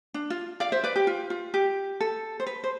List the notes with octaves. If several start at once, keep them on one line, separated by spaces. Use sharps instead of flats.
D4
F4
D5 F5
C5 E5
B4 D5
G4
F4
F4
G4
A4
C5
B4
C5